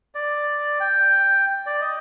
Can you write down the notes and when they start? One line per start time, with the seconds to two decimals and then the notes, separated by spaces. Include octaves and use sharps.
0.15 D5
0.80 G5
1.66 D5
1.81 D#5